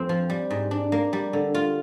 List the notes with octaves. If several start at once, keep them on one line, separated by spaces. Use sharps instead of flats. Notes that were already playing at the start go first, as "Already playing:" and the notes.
Already playing: F2 C4
F3
G3
G#2
D4
A#3
G3
D3
F4